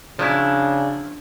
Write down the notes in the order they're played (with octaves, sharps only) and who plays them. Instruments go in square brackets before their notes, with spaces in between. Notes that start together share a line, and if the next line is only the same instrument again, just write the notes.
[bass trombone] C#3 [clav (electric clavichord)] F3 F#3 E4 [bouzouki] D4